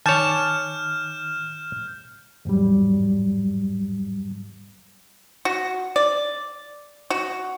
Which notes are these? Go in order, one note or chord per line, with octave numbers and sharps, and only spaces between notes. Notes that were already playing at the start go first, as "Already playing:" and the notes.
D#3 C#5 G#5 A5 D6 F6 G6 E7
E2 G#2 F#3 G3
F#4
D5
F#4